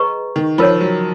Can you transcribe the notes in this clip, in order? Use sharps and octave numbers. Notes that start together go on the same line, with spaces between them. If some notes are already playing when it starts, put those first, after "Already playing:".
Already playing: G#4 B4 D#5 A#5 C#6
D#3
F3 F4 A#4 C#5
F#3